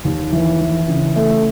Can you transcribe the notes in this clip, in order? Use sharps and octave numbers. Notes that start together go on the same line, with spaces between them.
D#2
E3
E3
C#3
A3